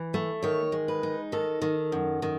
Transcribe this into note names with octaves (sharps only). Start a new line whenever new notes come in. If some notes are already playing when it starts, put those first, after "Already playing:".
Already playing: E3
A3
D#3 C#5
G#3
B4
D#4
D#3 A4
D#3
F#2
D#3